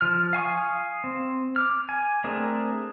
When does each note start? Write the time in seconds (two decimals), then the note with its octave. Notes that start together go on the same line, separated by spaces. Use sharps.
0.01 F3 F6
0.33 F5 G#5 C#6 D#6
1.04 C4
1.56 D6 F6
1.89 G#5
2.24 A3 C4 D4 G#4 A#4